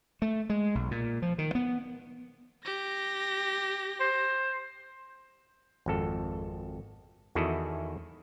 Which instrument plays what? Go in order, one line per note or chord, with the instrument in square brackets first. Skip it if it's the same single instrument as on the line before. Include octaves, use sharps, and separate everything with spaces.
[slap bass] A3
G#3
B1
A#2
F3
D#3
B3
[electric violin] G4 A#6
[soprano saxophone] C5
[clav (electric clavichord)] G#1 F2 A4
E2 D#3 E4 F#4 G#4 A4